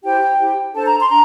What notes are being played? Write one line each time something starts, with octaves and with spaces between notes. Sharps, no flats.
E4 G4 C5 G5
E4 G4 C5
D4 A4 C5 A5
A#5
C6
D4 A#5